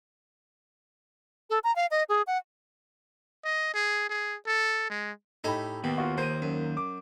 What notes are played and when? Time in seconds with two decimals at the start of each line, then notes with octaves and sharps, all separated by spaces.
1.50 A4
1.64 A#5
1.76 F5
1.91 D#5
2.09 G#4
2.27 F#5
3.44 D#5
3.74 G#4
4.10 G#4
4.47 A4
4.90 G#3
5.44 A2 D#4 G4 A4 G#5 B5
5.84 D#2 B2 G5
5.98 F4 F#4
6.18 A#3 C5 D#7
6.42 F#2
6.77 D6